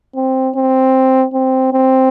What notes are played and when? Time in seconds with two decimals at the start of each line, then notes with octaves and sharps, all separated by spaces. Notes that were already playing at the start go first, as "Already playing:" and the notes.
0.15 C4
0.56 C4
1.33 C4
1.73 C4